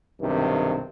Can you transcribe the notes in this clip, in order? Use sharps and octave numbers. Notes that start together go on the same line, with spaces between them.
B1 G2 C3 D#3